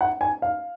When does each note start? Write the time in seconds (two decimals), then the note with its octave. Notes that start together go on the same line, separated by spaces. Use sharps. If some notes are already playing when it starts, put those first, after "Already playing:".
0.01 F#5
0.21 G#5
0.42 F5